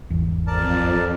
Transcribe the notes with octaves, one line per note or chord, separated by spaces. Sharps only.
G#1 E2
F2 A#4 D5 A5